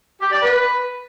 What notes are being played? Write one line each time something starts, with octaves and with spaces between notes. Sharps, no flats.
G4
D5
B4